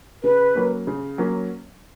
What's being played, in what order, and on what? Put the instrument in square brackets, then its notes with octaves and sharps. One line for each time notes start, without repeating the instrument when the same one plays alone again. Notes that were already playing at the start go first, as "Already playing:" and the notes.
[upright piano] C#3 [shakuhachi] B4
[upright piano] F#3 A#3 C#4
C#3
F#3 A#3 C#4